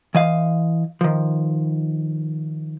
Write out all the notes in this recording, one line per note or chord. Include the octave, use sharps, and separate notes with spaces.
E3 D#5 F5
D#3 F3